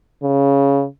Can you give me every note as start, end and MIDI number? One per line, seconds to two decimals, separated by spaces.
0.23 0.84 49